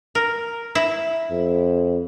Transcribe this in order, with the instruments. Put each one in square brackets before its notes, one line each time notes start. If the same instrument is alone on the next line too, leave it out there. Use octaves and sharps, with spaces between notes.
[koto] A#4
E4
[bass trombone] F2